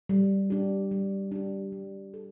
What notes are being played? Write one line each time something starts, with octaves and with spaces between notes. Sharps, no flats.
G3
D4 G4
G3
D4 G4
G3
A4